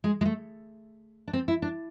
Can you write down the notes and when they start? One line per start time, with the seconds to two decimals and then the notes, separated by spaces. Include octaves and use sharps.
0.04 G#3
0.21 G#3
0.25 A3
1.28 D4
1.33 C4
1.48 E4
1.62 D4